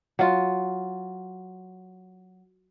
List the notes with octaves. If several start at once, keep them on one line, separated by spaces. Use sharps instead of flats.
F#3 F4